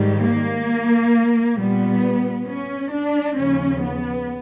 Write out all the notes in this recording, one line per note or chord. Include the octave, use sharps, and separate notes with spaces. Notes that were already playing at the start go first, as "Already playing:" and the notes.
Already playing: G#2 D#3 G3
A#3
A#2 G3 B3
C#4
D4
D#2 C#3 F3 C#4
B3